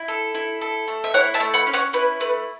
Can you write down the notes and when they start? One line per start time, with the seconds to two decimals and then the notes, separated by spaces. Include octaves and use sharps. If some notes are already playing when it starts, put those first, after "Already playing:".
Already playing: E4
0.08 A4
0.35 E4
0.61 A4
0.88 A3
1.04 E5
1.14 E4 C#5 F#5
1.34 E5 A5
1.40 A3
1.54 F#5 B5
1.67 C#4
1.73 C#5 F#5
1.93 E4 B4
2.20 A3 B4